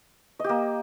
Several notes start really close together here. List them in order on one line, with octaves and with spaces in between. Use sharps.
D#5 G4 A#3